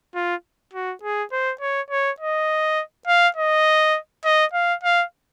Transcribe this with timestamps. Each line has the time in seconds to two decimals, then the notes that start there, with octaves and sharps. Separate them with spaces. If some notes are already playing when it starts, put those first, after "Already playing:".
0.15 F4
0.73 F#4
1.03 G#4
1.32 C5
1.61 C#5
1.90 C#5
2.20 D#5
3.07 F5
3.36 D#5
4.25 D#5
4.53 F5
4.83 F5